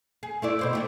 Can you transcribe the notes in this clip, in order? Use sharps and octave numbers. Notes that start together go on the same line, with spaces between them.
G#4
A3 E4 D5
B2 C5 D5
G3 A3 E4